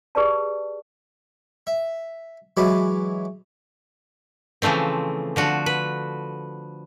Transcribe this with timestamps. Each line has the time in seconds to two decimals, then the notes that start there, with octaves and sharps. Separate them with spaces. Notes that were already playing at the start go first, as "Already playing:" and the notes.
0.15 G4 G#4 B4 D5 A5
1.67 E5
2.57 E3 F#3 G#3 B4 D6
4.62 C#3 E3 F3 A3 C4
5.36 D3 F3 F#4
5.66 B4